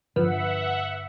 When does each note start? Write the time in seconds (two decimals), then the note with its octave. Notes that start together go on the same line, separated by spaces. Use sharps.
0.16 G2 D3 F3 D4 B4 E5 F#5